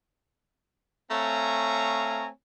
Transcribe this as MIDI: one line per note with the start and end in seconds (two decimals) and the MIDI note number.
1.11 2.28 57
1.11 2.28 60
1.11 2.28 73
1.11 2.28 77
1.11 2.28 80
1.11 2.28 82